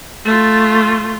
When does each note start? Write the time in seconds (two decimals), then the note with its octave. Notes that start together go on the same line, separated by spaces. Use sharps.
0.24 A3 F4